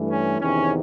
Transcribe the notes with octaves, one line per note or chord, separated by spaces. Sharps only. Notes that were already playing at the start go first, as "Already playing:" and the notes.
Already playing: G2 E3 A3
C#4
E2 C3 D#3 C#4